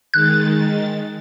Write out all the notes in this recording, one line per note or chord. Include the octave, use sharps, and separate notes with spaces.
D#3 G#3 F#6 A6